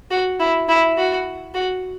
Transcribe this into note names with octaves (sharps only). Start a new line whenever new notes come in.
F#4
E4
E4
F#4
F#4